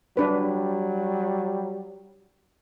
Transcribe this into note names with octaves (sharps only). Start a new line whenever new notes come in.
F#3 G3 D4 B4